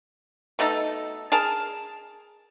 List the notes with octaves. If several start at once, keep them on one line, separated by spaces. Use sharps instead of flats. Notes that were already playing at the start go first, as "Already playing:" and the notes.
B2 A3 D#4 A4
G#4 A#4 A5